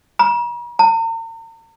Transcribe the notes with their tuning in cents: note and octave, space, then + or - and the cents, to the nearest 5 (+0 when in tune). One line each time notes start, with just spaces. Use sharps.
A#5 +45
A#5 -45